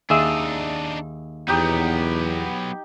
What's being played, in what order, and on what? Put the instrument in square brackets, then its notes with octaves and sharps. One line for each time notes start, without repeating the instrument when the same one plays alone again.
[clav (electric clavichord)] D#2 G#4 E5 [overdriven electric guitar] D4 D#4
[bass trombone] E2 [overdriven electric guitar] F#3 B3 [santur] D#4 G4